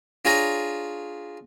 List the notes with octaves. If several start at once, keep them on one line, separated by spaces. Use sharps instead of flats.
D4 F4 G#4 C#5 G#5 A#5